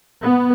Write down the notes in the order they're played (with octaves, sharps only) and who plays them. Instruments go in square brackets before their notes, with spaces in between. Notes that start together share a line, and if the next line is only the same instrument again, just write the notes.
[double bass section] B3